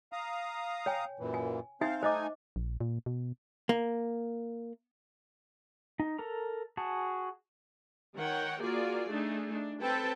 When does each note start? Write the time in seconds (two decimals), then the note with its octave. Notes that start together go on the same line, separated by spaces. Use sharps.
0.12 F5 A#5 D#6
0.86 C#5 G5 G#5
1.19 F#2 A#2 E3
1.34 G#5
1.81 C4 D#4 C5 E5 F5 G#5
2.03 A3 D#4 C5 D#5 G#5 D6
2.56 A#1
2.81 A#2
3.06 B2
3.69 A#3
6.00 D#4
6.18 A4 A#4 A#5
6.77 F#4 G#4 A5
8.15 D#3 A#4 C#5 F#5 G5
8.60 A#3 F4 F#4 G#4 D5
9.09 A3 D4 D#4 G#4
9.52 D4
9.81 C4 A4 B4 G5 A5